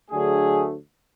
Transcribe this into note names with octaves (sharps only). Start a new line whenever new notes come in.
D2 D3 F#3 A3 G#4